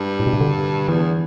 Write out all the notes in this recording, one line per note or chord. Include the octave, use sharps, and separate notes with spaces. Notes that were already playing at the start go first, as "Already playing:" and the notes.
Already playing: G2
A2
B2
C3
D3
E2 E3